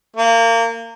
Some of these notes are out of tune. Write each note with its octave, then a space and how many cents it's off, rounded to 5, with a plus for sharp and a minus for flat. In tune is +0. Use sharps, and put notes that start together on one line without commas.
A#3 -25